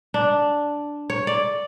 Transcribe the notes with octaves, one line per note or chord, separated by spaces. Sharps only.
D4
C#5
D5